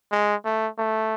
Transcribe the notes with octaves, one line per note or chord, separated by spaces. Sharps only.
G#3
A3
A3